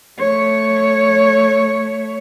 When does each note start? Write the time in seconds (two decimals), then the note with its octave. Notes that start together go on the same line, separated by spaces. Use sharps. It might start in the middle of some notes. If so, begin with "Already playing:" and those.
0.19 A3 C#5